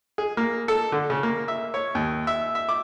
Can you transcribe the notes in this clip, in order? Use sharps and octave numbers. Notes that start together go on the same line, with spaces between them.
G#4
A#3
A4
D3
C#3
A#3
E5
C#5
D#2
E5
E5
D6